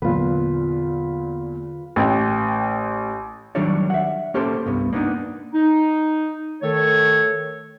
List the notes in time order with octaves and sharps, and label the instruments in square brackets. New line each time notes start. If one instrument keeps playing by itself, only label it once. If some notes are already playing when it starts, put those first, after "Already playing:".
[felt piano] E2 A#2 [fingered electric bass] D3 F#3 [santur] F4 B4
[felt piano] A1 G5
[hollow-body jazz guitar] D#3 F#3 G3 D4 C#5 D5
E5 F#5
A#3 C#4 G4 A4 C5
C2 G2 B3
A#3 B3 D4 D#4
[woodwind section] D#4
D#3 A3 A4 C#5